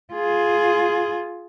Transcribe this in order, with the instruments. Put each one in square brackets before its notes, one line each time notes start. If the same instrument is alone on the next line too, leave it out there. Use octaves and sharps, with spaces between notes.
[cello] F4 G#4